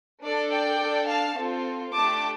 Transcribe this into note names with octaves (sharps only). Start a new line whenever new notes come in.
D4 A4 D5
D5 G5
D4 A4
F5 A5
C4 F4 A4
A3 D4 G4 A5 D6